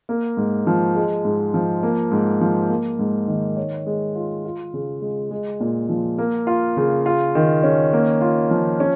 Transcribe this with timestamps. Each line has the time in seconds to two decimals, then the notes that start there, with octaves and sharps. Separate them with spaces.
0.09 A#3
0.37 G#2
0.67 F3
0.95 G#3
1.25 G#2
1.54 F3
1.83 A#3
2.12 G#2
2.41 F3
2.70 A#3
2.99 G#2
3.28 D#3
3.57 C#5
3.86 G#3
4.15 F4
4.45 F4
4.74 C#3
5.02 G#3
5.31 G#3
5.60 A#2
5.89 F3
6.18 A#3
6.47 F4
6.77 C#3
7.06 F4
7.35 D#3
7.63 C#4
7.93 A#3
8.21 F4
8.51 F3
8.80 C#4